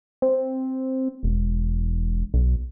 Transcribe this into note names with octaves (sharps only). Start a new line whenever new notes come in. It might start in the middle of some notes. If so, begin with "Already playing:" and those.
C4
E1
B1